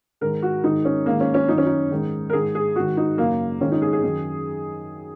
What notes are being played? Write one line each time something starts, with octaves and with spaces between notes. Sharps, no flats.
G#2 D#3 A#4
F#4
G#2 D#3 D#4
C#4
G#2 D#3 A#3
C#4
C#4
F#2 D#3 D#4
C#4
D#4
G#2 D#3
A#4
G#2 D#3 G#4
G#4
G#2 D#3 F#4
D#4
F#2 C#3 A#3
G#2 D#3 C#4
D#4
G#4
G#4
F#2 D#3